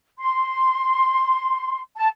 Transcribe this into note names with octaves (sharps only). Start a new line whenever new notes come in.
C6
A5